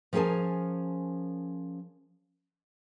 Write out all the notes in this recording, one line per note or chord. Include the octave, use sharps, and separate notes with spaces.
F3 C#4 G#4 A#4 G#5 A5